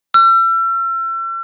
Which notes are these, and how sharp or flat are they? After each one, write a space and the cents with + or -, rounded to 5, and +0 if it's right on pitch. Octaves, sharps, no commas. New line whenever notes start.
E6 +40